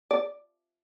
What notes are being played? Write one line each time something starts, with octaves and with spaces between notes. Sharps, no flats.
D5